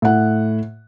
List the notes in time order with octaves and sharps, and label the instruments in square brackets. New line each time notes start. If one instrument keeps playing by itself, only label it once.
[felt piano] A2 F#5